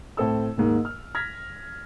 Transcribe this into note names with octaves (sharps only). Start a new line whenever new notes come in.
A2 C4 A4 E6
D#2 G#2 A#3
F6
F6 G#6 A#6 B6